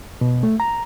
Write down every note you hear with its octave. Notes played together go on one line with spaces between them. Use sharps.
B2
A3
A#5